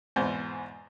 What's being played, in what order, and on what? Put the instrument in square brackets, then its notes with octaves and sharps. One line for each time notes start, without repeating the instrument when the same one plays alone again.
[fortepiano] E2 G#2 B2 C5